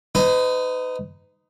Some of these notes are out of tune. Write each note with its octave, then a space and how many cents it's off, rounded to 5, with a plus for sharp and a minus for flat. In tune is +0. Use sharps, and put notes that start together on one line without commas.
D#4 +0 B4 +40